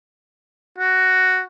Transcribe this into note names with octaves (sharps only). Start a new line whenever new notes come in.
F#4